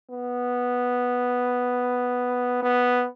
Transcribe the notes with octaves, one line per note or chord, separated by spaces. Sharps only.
B3
B3